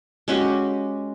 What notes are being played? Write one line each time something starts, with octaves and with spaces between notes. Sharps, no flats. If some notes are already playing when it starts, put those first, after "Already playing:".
G#3 C#4 F#4 G4